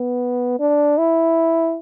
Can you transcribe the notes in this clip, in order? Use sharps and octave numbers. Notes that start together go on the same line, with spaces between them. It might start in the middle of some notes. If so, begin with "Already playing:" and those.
Already playing: B3
D4
E4